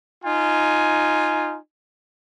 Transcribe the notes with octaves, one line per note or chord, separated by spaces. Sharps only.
D#4 F4 G#5